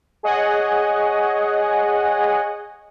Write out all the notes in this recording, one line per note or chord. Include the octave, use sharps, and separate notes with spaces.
G#4 C#5 D#5 F#5 G#5